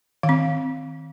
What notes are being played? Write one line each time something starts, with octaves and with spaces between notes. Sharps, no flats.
D#3 F5
C4